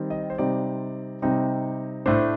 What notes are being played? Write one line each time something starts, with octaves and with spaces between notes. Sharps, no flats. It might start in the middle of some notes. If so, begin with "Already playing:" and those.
Already playing: D#3 G3 C4 D#4
D#5
C5
C3 G3 C4 D#4 D5
C3 G3 C4 D#4
A2 A3 D4 C5